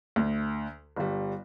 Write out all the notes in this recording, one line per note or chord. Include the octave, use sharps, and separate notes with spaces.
D2
G1 G3